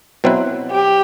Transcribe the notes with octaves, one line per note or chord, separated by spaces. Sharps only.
B2 F#3 C4 E4 B4
G4